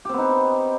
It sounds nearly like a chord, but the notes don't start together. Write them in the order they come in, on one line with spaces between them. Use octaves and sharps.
G4 C4 B3 D#4